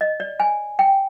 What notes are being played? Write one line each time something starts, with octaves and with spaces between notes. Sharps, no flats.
D#5
D5
G#5
G5